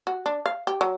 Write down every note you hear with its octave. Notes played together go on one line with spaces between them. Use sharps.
F#4
D4
F5
G4
F#3